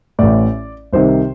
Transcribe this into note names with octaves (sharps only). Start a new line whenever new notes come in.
A1 A2 D5
C2 C3 D#3 C5